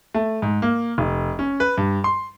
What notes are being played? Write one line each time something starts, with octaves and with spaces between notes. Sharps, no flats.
A3
G#2
A#3
F1
C#4
B4
G2
C6